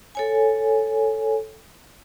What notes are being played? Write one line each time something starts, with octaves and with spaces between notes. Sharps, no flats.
A4 C#5 G#5